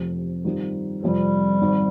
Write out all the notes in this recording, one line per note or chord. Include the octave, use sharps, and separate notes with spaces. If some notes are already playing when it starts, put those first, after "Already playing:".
Already playing: F1 F2 C3
G2 D#3 G3 C4 F4
F2 C3 F3 G3 C4
G#1 G#2 D#3